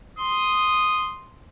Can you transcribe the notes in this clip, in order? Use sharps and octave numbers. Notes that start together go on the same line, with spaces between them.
C6 D#6